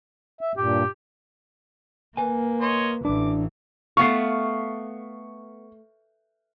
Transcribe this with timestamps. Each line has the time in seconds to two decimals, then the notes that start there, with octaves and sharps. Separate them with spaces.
0.41 E5
0.57 G2 A#2 G4
2.17 A#3 B4 G#5
2.61 C#5 D#5 C6
3.05 A1 E3 D4 D6
3.97 A3 B3 F5 C#6 C7